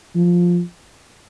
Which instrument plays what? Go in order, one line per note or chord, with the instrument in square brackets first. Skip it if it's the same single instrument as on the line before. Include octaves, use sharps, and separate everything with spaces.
[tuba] F3